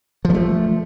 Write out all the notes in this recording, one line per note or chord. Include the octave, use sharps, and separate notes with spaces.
F3 G3 A3